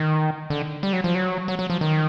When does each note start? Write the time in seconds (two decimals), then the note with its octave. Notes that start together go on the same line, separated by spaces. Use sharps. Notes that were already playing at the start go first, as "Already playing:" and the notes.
Already playing: D#3
0.50 D3
0.83 G3
0.93 F#3
1.04 F3
1.15 F#3
1.48 F#3
1.59 F#3
1.70 F3
1.81 D#3